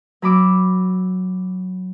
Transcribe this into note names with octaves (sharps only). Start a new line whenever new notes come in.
F#3 B5 D6 E6